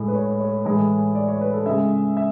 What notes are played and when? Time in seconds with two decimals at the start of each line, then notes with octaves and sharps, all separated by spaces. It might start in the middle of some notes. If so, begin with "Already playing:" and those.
Already playing: A2 G#3
0.08 B4
0.15 C#5
0.40 C#5
0.65 A2 E3 G#3
1.15 D5
1.28 C#5
1.41 B4
1.53 A4
1.66 C#3 G#3 E5
2.17 E5